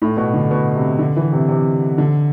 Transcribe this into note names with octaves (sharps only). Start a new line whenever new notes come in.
A2
B2
D3
B2
C3
D3
E3
C3
C3
D3